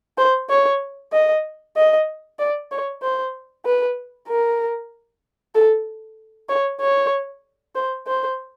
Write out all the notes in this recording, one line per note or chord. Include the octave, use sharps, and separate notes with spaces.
C5
C#5
D#5
D#5
D5
C#5
C5
B4
A#4
A4
C#5
C#5
C5
C5